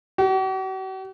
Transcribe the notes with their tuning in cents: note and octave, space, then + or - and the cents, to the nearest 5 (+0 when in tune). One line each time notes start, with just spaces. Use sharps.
F#4 +45